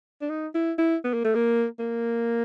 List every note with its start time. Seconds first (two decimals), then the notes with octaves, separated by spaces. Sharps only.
0.21 D4
0.30 D#4
0.55 E4
0.79 E4
1.05 B3
1.14 A#3
1.25 A3
1.35 A#3
1.79 A#3